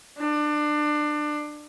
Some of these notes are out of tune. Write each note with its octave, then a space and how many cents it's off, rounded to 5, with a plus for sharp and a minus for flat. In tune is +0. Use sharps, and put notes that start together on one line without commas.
D4 +25